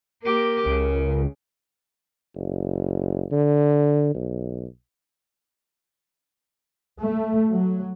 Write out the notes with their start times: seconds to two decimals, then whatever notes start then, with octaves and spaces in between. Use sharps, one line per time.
0.23 A#3 G4 A#4
0.66 C#2 C#3
2.35 F#1
3.32 D3
4.15 B1
7.01 A3
7.53 F#3